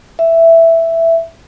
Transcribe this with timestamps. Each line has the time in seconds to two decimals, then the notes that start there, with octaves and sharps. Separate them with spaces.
0.19 E5